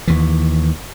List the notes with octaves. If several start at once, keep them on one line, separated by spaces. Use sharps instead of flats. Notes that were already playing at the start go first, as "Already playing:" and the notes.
D#2 E3